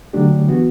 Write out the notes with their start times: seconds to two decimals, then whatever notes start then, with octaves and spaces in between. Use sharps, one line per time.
0.13 D3 F#3 A3 D4 G4
0.47 E3 B3 F#4